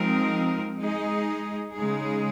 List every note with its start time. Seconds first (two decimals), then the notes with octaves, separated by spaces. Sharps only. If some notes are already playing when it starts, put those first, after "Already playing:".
Already playing: F3 G#3 C4 D#4 A#4
0.79 G#3 D#4 G#4 D#5
1.74 C#3 G#3 D#4 G#4